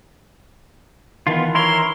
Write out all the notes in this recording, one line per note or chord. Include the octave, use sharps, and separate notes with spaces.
D#3 E3 B3 F4 A5
E4 A#4 C#5 C6